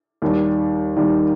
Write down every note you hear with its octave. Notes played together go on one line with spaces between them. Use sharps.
D#2 D#3 G3
D#2 D#3 G3